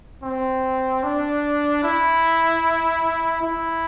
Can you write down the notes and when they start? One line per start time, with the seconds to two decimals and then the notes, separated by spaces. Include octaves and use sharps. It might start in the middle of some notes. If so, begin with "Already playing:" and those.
0.23 C4
1.04 D4
1.84 E4
3.43 E4